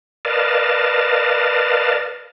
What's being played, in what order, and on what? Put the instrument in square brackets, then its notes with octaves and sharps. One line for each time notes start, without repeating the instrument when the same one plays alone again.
[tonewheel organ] A#4 B4 D5 D#5 F5 A5